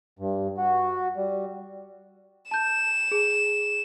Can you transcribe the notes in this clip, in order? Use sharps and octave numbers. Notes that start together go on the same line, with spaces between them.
G2
F#4
G3
A5 G6 E7
G#4